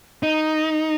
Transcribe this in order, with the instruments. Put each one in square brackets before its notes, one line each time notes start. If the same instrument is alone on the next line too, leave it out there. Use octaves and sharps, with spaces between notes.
[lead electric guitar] D#4